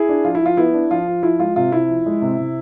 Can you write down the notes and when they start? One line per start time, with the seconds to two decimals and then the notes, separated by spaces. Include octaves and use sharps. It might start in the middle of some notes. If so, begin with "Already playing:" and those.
Already playing: E4 G#4
0.09 D4
0.24 F3 F4
0.35 E4
0.41 F3 F4
0.57 B3 E4
0.74 D4
0.91 F3 F4
1.08 F3
1.23 F3 E4
1.39 G#3 F4
1.56 C3 F4
1.72 C3 E4
1.89 F3
2.06 G#3
2.22 C3
2.38 C3